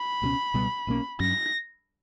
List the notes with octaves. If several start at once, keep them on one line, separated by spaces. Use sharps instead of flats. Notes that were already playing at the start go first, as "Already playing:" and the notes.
Already playing: B5
C#2 B2 G3 C#4
C#2 B2 G3 B3
B1 B2 A#3 C#4
G2 F#3 C#4 A#6